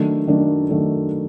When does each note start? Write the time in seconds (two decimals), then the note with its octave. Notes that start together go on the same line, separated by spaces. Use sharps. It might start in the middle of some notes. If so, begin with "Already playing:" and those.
Already playing: D#3 F#3 A3 D4
0.27 D#3 F#3 A3 D4
0.70 D#3 F#3 A3 D4